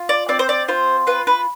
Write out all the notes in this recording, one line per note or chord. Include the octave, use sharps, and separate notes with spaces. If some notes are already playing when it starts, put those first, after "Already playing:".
Already playing: F4
D5
C4 D5
C5
D5
F4 C5
F4 B4
B4